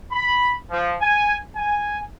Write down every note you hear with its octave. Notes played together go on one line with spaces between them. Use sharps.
B5
F3
G#5
G#5